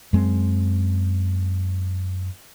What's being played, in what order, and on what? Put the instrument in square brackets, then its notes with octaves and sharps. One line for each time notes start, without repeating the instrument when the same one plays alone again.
[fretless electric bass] F#2 G#3 C4